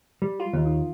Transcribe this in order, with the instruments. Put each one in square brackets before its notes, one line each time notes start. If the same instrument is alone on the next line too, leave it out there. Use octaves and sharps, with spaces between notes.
[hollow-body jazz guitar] G3
[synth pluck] F4
[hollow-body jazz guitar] D#2
[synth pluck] D#3